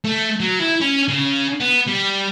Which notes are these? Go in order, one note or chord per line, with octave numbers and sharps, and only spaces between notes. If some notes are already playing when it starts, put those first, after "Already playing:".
A3
F#3
E4
C#4
C#3
B3
G3